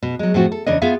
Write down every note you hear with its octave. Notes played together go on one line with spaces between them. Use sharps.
B2
F#3 G#3
A2 F3 C4 F#4
A4
E2 C#3 D4 C#5 D#5
B3 F4 G#4 E5 F5